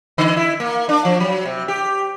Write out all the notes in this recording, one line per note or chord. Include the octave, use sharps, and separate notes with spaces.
D3
E4
A#3
D4
F3
F#3
C3
G4